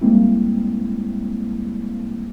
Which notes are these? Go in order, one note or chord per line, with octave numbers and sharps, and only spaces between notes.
G3 G#3 A#3 C4 E4